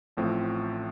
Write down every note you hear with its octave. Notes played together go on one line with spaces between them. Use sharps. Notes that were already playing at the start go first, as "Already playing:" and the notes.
A1 A2 F3 C4